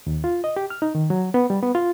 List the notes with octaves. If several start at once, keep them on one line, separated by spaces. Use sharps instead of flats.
D#2
F4
D#5
G4
F6
D#4
D#3
F#3
B3
G3
B3
F4